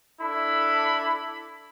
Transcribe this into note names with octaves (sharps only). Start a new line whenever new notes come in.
D4 E4 A4 B5